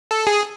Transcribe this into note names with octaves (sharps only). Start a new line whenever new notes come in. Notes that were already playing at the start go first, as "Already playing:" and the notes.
A4
G#4